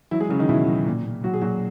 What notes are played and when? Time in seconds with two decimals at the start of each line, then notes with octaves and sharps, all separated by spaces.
0.11 E3 F#3 E4
0.20 G#3 G#4
0.29 C#3 F#3 C#4
0.39 D#3 D#4
0.49 B2 E3 E4
0.67 F#3
0.86 A#2
1.05 A#2
1.24 F#3 F#4
1.33 G#4
1.42 A#2 F#3 F#4